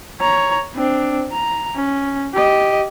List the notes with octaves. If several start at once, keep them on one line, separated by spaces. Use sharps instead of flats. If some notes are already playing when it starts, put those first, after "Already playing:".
C#5 A#5
C4 D4
A#5
C#4
G4 D#5